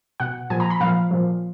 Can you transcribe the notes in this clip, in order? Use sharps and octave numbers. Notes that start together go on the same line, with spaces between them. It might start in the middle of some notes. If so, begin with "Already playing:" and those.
B2 F#5
A#2 F3 G#5
A#5
B5
A#2 F3 F5
A#2 F3